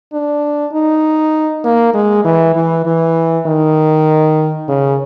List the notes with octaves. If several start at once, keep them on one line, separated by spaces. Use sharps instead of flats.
D4
D#4
A#3
G#3
E3
E3
E3
D#3
C#3